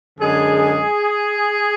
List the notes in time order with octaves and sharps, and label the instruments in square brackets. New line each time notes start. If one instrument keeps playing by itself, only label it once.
[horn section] F#2 D3 G#3 G#4